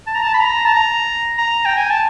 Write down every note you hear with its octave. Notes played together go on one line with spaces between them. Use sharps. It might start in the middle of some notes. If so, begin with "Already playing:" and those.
A5
A#5
A5
B5
A#5
A5
A#5
A#5
G5
G#5
A5